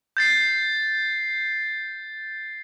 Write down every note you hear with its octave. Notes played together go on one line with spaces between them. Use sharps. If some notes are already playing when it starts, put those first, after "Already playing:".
G6 A6 C7